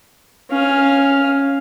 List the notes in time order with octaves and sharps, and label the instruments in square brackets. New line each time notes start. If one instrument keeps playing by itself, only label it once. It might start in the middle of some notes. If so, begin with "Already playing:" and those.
[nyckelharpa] C#4 F5